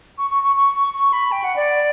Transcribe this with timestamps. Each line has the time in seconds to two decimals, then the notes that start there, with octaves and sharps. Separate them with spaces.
0.18 C#6
0.31 C#6
0.44 C#6
0.56 C#6
0.94 C#6
1.13 B5
1.32 G5
1.44 F#5
1.56 D5